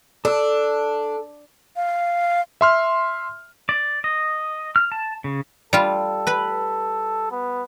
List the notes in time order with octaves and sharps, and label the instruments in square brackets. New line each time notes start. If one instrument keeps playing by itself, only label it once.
[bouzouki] D4 [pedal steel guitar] A4 E6
[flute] F5
[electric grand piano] E5 C6 F6
[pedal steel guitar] D5
D#5
F6
A5
C#3
[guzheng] G3 F4 [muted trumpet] A4
[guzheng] B4 B5
[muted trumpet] B3